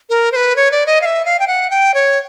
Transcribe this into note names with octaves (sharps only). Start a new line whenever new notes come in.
A#4
C5
B4
C#5
D5
D#5
F5
E5
F5
G5
F#5
G5
C#5